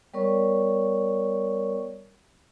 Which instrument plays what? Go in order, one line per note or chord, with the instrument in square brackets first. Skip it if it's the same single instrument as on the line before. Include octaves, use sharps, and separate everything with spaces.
[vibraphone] G3 B3 A#4 C#5 D5 C#6